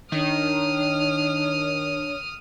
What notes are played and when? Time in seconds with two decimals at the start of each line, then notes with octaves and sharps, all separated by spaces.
0.12 D#3 D4 C#5 D#6 F6